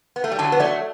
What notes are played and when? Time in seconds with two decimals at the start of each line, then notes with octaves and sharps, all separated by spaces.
0.16 B3
0.24 A3
0.32 G3
0.39 D3 F#3 A5
0.52 B3
0.60 F#3 A3 D5